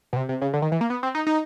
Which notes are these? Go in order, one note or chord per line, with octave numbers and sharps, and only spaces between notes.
B2
C3
C3
C#3
D3
D#3
E3
A#3
B3
C4
D#4
D#4